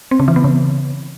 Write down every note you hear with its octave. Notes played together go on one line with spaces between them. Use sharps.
C4
C#3
E3
B3
C#3